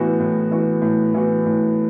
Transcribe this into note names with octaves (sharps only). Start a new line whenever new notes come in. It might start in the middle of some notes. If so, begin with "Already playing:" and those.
Already playing: A2 E3 B3 F#4
A2
E3 B3 F#4
A2
E3 B3 F#4
A2